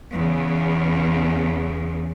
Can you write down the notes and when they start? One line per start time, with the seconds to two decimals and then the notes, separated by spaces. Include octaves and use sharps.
0.12 E2 C#3